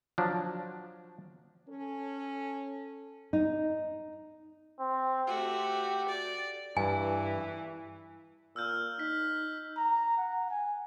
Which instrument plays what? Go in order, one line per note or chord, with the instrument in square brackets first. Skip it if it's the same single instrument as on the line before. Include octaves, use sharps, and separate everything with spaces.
[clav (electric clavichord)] F3 F#3 D4
[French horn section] C#4 A4
[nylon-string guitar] D#4
[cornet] C4
[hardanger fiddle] A3 F#4 [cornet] G4
[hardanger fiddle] D5
[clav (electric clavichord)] G2 [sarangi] E3 [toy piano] G#5
[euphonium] A#2 [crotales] E6 F6 G6
[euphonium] D#4 [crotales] B6
[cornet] A#5
F#5
G#5